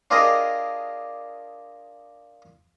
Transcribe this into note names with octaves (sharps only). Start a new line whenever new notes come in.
D4 F4 G4 G#4 A#4 D#5